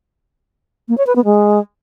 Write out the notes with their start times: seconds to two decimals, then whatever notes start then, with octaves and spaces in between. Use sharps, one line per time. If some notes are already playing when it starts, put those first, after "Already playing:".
0.88 A#3
0.98 C#5
1.07 B4
1.16 B3
1.25 G#3